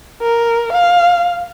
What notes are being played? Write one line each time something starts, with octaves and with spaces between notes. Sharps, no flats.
A#4
F5